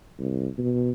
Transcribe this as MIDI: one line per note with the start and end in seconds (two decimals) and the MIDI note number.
0.19 0.47 36
0.58 0.92 47